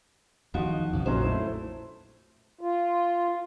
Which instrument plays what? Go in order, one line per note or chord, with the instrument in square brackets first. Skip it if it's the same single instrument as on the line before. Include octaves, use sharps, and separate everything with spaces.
[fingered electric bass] E2 D#3 [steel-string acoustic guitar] F3 F#4 D#5
[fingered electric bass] F#1 B1 C#3
[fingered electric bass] A#1 F2 A#2 [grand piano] F#3 C#4 D#4 [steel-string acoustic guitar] C5
[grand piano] A3 E4
[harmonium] F4